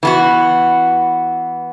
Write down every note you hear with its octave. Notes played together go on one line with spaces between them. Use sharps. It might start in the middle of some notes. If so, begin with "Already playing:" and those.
E3 B3 F#4